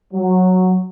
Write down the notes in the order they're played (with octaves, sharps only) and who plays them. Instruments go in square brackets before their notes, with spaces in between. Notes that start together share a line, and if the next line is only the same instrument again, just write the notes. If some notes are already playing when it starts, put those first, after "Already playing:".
[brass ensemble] F#3